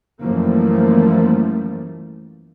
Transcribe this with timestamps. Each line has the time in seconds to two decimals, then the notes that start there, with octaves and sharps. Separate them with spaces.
0.21 F#2 E3 F3 G3 A3 A#3